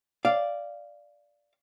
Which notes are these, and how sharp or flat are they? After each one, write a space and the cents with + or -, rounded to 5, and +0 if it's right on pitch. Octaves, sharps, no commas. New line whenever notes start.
D5 +0 F5 -10